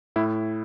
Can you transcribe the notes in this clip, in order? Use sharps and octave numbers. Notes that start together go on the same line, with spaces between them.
A2 E4